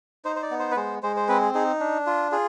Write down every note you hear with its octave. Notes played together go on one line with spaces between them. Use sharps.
D#4 C5
C5
D5
B3
C5
B4
G#3 C5
G#3 C5
C5
C4 B4
G#4
D#4 G#4
D4
F4
F4 G#4